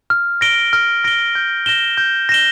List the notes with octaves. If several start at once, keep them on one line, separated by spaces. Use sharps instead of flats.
F6
A#6 D7 G7
F6
A#6 D7 G7
G6
A#6 E7 G7
G6
A#6 E7 G7